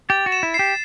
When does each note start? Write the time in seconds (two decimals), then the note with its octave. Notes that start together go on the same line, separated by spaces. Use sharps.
0.09 G4 A6
0.26 F#4
0.32 E7
0.43 E4
0.54 C7
0.59 G4